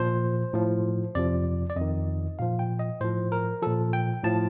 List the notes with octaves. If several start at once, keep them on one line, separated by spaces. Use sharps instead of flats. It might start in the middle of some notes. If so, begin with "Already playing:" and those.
Already playing: A#2 F3 C5
A2 F3
F2 C3 F3 D5
D5
F2 D#3 D#5
A#2 F3 F5
G5
D#5
A2 F3 C5
A#4
A#2 F3 A4
G5
A2 F3 A5